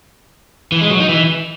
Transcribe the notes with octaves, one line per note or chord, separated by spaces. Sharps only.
E3
G#3
F#3
D#4
E3